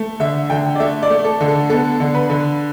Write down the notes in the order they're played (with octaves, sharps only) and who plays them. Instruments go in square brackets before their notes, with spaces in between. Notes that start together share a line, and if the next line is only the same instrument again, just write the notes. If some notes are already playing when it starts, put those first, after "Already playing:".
Already playing: [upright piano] A3
D3 E5
D3 G5
D5
A3 E5
D5
A3
A4
D3
A4
B3 A4
D3
B4
D3